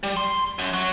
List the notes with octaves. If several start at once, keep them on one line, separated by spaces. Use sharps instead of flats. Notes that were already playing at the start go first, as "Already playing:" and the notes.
G3
C6
F#2
F#3